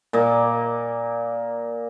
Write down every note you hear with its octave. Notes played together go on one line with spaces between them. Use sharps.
A#2 A#3 D#5 D6